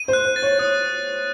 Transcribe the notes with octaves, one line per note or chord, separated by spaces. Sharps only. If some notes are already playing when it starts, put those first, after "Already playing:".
Already playing: D#7
C5
F#6
C5
A6
C#5
C#5 D#6